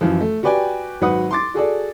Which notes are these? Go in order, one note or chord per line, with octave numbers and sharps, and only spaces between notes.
F#2 E3 F3
A3
F#4 G4 B4 D5 G5 G#5
G#1 F#3 B4 F#5 D#6
C6 D6 A6
F#4 G#4 A4 D5